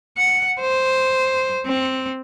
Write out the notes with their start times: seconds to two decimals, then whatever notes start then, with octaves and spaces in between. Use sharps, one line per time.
0.18 F#5
0.61 C5
1.66 C4